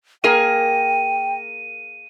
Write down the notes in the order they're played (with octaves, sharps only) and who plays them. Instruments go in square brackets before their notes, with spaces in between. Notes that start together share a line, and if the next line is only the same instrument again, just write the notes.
[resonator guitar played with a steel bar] A#3 G#4 A#4 [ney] G5 [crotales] D#7